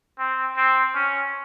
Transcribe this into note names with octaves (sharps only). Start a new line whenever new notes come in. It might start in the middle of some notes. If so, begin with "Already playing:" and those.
C4
C4
C#4